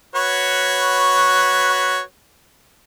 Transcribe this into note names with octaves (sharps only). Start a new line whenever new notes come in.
F#4 B4 C#5